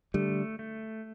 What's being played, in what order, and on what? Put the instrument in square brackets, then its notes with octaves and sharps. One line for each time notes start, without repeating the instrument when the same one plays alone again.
[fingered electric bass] D3 G3 [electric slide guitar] A3
[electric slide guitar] A3